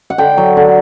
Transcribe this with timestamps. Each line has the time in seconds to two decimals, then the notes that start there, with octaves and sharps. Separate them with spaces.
0.10 F#5
0.18 D3 G5
0.38 F#3
0.57 D3